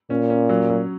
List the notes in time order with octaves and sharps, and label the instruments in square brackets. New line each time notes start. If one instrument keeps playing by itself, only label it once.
[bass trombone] A#2 [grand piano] C#4
[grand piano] C#4
F#3
F#3